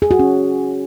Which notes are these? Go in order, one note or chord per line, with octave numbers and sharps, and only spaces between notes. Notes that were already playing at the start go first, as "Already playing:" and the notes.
G#4
F#4
C#4